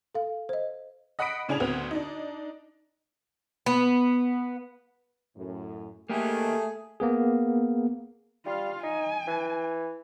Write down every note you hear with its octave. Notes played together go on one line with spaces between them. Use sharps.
A4 F5
C5 D#5
D#5 F#5 B5 D#6 B6 D7
A2 C#3 D4 G#5 G#6 F7
D2 B3 C4 F#4
D4 D#4
B3
F#2 A2
A3 A#3 G4 G#4
A#3 B3 G#4
G3 F4 F5
D#4 G#5
E3